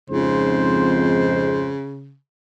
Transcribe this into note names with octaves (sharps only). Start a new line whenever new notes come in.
F2 G#2 C#3 C5